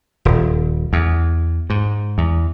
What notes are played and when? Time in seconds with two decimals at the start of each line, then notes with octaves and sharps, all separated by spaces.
0.25 D#1
0.93 E2
1.70 G#2
2.18 E2